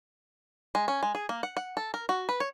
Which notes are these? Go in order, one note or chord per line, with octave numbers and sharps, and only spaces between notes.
G#3
C#4
G#3
G#4
A#3
F#5
F#5
A4
A#4
F#4
B4
C#5